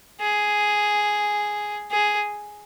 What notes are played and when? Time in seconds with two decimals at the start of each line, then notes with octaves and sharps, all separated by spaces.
0.21 G#4
1.91 G#4